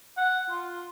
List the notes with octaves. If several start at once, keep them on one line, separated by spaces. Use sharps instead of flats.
F#5
F4